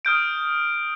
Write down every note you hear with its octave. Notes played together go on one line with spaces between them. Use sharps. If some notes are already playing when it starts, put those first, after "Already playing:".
D#6 F6 G6 D7